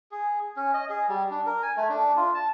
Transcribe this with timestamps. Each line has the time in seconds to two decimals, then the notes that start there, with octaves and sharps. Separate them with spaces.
0.11 G#4
0.57 C#4
0.74 D#5
0.90 G#4
1.09 G3
1.31 D4
1.46 A#4
1.63 G#5
1.77 A3
1.90 D4
2.16 F4
2.34 A5